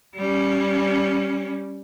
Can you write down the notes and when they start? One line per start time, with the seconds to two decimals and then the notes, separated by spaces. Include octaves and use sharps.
0.16 G3 C#4